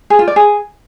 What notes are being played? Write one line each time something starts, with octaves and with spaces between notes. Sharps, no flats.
G#4
F4
D5
G#4